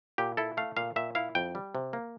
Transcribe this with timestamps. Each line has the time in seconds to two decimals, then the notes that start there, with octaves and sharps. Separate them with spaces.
0.18 A#2 G4
0.37 E4 A4
0.57 A3 F5
0.77 A#2 F5
0.96 A#2 E5
1.15 E4 F5
1.35 F2 G5
1.55 G3
1.75 C3
1.93 A#3